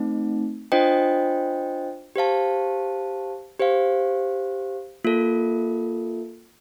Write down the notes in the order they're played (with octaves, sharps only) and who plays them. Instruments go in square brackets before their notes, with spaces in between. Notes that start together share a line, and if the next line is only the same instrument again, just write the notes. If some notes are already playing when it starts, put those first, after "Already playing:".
Already playing: [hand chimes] A3 C4 D#4
D4 F4 C5 D#5 G5
G4 C5 F5 A5
G4 C5 F5
A#3 F4 A4